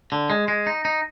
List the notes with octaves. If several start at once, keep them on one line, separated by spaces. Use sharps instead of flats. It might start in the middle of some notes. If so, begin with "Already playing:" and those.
D3
G#3
G#3
D#4
D#4